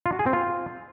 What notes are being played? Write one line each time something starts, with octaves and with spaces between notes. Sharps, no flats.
F4
F#4
G#4
C4
F4